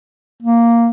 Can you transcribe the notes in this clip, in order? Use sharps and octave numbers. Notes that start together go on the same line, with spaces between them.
A#3